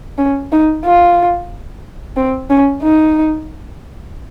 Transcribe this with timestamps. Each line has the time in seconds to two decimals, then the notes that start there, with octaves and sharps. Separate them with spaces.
0.18 C#4
0.52 D#4
0.85 F4
2.16 C4
2.50 C#4
2.83 D#4